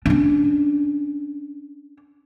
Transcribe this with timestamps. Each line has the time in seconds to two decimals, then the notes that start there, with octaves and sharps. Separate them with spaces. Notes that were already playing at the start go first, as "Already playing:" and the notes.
0.06 C#4 D4